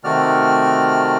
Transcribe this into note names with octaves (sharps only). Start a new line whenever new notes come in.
C3 D#3 A3 F#4 D5 F6